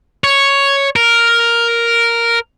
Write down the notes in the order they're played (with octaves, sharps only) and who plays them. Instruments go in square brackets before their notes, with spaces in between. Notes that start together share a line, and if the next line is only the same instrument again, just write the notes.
[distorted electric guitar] C#5
A#4